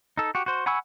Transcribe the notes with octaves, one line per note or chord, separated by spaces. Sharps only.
D#4 A4
F#4 G4
F#4 C5
F#5 G#5 B5 C#6 E6